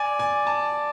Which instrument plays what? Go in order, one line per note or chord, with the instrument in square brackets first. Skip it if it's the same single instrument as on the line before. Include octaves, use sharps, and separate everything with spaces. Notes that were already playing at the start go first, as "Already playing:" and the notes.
Already playing: [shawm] D5 [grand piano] G#5
[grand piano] G#5
A5